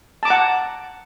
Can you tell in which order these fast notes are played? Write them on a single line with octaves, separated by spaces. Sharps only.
A5 D6 A#5 F#5